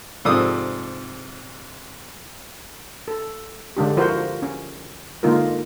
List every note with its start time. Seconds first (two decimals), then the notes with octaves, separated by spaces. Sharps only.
0.25 G#2 C3 F3 A4 D5 D#6
3.08 A4
3.77 D3 G#3 D4 G4
3.97 F3 E4 F#4 A#4 C5
4.42 C#4
5.23 D3 G#3 A#3 D#4 F4 A#4